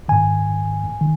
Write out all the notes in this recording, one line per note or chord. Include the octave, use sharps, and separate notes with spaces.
G#2 D#3 G#5
D#3